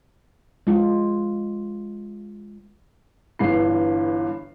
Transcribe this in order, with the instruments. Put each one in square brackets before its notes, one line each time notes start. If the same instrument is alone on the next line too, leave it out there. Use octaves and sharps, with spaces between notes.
[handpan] G#3 F4
[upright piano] G1 G2 E3 C7